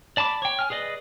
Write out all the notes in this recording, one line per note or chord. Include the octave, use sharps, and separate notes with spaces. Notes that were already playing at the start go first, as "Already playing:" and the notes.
D5 A5 B5 D6
C#5 G5
G#5 F6
G#4 B4 D5 D#5